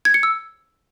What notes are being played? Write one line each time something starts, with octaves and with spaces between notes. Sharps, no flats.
G#6
C#7
E6